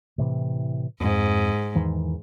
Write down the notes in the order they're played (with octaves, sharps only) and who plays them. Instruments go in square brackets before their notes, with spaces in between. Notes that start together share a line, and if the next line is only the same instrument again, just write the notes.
[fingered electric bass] A2 C3 E3
[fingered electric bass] F2 [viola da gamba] G#2
[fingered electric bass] E2 D#3 E3